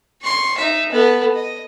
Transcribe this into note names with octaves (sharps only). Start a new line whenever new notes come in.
C6 C#6
D#4 E5
B3 A4
D#5